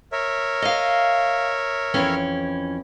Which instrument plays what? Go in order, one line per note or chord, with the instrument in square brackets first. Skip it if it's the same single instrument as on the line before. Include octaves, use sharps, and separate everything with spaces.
[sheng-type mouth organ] A#4 C#5 E5
[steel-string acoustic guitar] D#5 F5
F2 E3 C#4